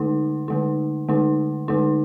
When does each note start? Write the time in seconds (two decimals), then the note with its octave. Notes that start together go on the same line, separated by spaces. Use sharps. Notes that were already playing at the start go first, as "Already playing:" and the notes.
Already playing: D3 A3 D#4
0.48 D3 A3 D#4
1.09 D3 A3 D#4
1.68 D3 A3 D#4